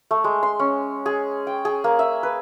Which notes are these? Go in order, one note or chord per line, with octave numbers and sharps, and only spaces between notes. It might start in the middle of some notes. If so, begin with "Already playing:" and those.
A3
G#3
C6
C#4
G#4
G5
G#4
A#3
E5
B4